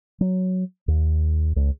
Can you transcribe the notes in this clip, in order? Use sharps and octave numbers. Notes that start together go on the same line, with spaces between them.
F#3
D#2
C#2